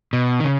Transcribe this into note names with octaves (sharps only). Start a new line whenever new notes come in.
B2
D#3
C#3